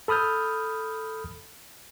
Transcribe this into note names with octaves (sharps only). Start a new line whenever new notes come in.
A4 B5 D#6 F6 G6